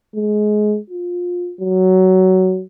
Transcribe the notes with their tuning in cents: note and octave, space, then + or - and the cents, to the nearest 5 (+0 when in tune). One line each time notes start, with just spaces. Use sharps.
G#3 +20
F4 +20
F#3 +15